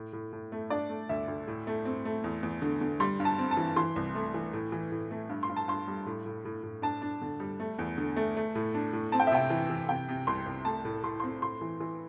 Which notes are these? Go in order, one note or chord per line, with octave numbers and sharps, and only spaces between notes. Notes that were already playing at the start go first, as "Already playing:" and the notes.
Already playing: A2
A2
A2
A3
D4 D5
A3
D2 E5
D2
A2
A3
C4
A3
E2
E2
D3
D3
G3 C6
G2
A5
C4
A5
E3
E3 C6
C2
A3
E3
A2
E3
A2
A3
G2
C6
G2
A5
G2 C6
G3
A2
A2
A2
A2
D4 A5
D4
D3
G3
A3
E2
D3
A3
A3
A2
D4
A2
C4 A5
G5
E5
C3 G5
E3
E3
C3 G5
C3
C2 C6
C2
A3 A5
A2
A2 C6
C6
C4
A2 C6
E3
E3